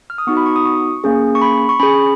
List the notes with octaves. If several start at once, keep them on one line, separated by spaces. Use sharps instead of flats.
F6
D#6
B3 D#4 F#4 C#6
B5
C#6
D#6
C#6
A#3 C#4 G#4
C#6
B5
C#6
C#4 G#4 B5